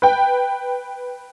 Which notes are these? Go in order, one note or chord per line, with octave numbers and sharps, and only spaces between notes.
B4 G5